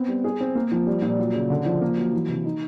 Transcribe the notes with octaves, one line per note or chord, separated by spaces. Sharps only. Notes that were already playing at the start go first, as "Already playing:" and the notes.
Already playing: B3 C4
G3
G#4
C4
A#3
F3
G3
A#2
F#3
C#3
D3
F3
A#3
F#3
E3
C3
D#4